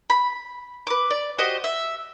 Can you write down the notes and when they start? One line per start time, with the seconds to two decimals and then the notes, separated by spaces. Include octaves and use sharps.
0.10 B5
0.87 B4 D6
1.10 D5
1.38 F#4 G4 C5 D#5
1.64 E5